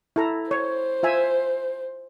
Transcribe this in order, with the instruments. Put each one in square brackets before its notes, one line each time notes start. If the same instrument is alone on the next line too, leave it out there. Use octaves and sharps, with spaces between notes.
[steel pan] E4 A4 A#5
[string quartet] C5 [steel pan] C#5
[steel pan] F4 E5 G#5